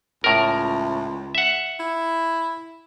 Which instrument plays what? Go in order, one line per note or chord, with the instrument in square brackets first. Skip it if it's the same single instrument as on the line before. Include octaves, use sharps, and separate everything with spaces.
[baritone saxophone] C#2 [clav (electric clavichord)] A2 A#4
[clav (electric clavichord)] E5 F#5
[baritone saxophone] E4